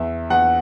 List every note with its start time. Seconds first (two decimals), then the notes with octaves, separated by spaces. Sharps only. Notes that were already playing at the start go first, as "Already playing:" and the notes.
Already playing: E2 E5
0.30 E2 F#5